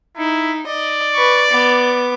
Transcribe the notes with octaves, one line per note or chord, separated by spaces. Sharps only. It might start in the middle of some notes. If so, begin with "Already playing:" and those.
D#4 E4
D5 D#5
B4 C#6
B3 D6